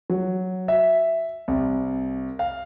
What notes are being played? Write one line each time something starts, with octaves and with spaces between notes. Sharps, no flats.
F#3
E5
C2
F5